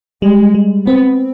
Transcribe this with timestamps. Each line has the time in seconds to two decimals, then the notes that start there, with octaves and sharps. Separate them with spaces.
0.22 G3 G#3
0.54 G3
0.87 B3 C4